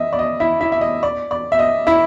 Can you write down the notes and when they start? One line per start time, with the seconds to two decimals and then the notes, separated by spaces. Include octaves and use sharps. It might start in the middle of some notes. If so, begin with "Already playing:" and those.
Already playing: D#5 E5
0.13 D5
0.19 D#5
0.40 E4 E5
0.61 E4 E5
0.72 E5
0.81 D#5
1.03 D5
1.31 D5
1.52 E5
1.59 D#5
1.87 E4 E5